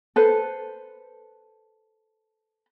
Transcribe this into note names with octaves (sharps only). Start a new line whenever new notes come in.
A4 B4 C5